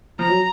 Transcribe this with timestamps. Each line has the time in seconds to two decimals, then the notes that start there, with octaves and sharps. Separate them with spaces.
0.19 F3 A#5
0.29 F#3